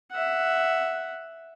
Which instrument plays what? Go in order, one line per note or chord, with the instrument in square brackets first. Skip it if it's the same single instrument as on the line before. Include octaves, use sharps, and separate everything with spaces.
[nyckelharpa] E5 F#5